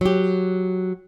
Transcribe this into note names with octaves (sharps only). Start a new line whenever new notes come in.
F#3 G4